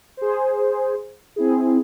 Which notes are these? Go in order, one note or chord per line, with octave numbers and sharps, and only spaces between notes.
G#4 C5
C4 E4 G#4